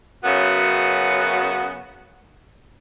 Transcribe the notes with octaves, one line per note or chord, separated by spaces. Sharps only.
F#2 C#3 B3 F#4